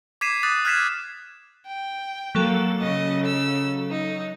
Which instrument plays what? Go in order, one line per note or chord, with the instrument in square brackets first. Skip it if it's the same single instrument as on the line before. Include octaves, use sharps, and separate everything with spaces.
[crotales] D6 G#6 B6 C7 D#7 E7
D6 D#6 F#6 A6
F6 F#6 G#6 B6 C7 E7
[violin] G5
[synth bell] F#3 A4 [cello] A#3
[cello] C#3 [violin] D#5
[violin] E6
D#4